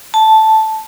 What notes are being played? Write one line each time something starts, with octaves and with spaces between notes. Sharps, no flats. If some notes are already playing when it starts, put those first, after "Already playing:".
A5